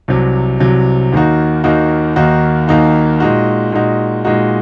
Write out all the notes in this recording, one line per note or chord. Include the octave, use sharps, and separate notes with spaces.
C2 C3 F#3
C2 C3 F#3
D#2 D#3 A#3 D#4 F#4
D#2 D#3 A#3 D#4 F#4
D#2 D#3 A#3 D#4 F#4
D#2 D#3 A#3 D#4 F#4
A#2 G#3 D#4 F#4
A#2 G#3 D#4 F#4
A#2 G#3 D#4 F#4